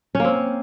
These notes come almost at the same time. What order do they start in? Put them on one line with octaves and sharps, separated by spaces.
C#4 A#3 C4